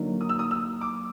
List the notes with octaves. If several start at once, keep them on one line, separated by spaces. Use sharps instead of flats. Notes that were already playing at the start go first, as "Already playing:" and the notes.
Already playing: D3 F#3 A#3 D#4
D#6
E6
D#6
E6
D6